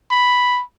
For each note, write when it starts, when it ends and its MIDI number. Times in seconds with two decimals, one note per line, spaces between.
0.11 0.62 83